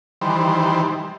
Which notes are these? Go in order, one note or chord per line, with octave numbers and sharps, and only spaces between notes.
D#3 E3 G3 C5